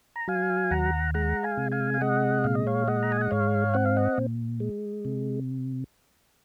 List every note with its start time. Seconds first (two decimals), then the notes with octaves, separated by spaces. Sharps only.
0.16 A#5
0.28 F#3 F5 G#5
0.71 D#2 F#5 A#5
1.14 G#3 F#5 A#5
1.43 F5 G#5
1.57 C3
1.72 F5 G#5
1.94 F5
2.01 G#3 D#5 F#5
2.44 A#2 F5
2.55 D#5
2.67 C#5 F5
2.87 G#3 D#5 F#5
3.03 A#5
3.12 G#5
3.21 F#5
3.31 G#2 C#5 F5
3.74 C4 F#5
3.86 F5
3.96 D#5 F#5
4.18 A#2
4.60 G#3
5.05 C3